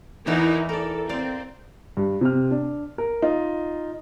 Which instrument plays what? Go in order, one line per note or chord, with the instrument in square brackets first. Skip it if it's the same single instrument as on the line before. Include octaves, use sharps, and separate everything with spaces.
[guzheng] E2 E3 F#5 [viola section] D#4 E4 A#4
[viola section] A4 [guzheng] A#4 D5
[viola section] C4 [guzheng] D5 F5
[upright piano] G2
C3 F6
D4
A#4
D#4 F4